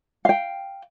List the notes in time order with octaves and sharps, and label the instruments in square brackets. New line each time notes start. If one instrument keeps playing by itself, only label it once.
[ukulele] F5 G5